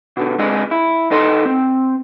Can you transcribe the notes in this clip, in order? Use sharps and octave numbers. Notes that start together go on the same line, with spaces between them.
B2 D3
C#2 G#3 C4 D4 G#4 D#5
E4
D#2 D#4 A4 D#5 C6
C4